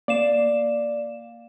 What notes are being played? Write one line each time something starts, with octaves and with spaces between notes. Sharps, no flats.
A#3 D5 F5 E7